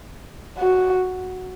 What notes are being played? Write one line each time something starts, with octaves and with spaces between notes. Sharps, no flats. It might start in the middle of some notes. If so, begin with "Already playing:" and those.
F#4